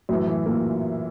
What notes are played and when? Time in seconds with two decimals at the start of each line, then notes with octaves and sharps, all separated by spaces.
0.09 F#2 A2 E3 F#3
0.28 E3
0.46 A#2 A#3